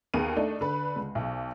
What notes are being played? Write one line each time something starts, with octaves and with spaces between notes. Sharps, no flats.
D#2 B3 G#4 A#4 D#7
A3 D4 D#4
D3 B4
C#2
B1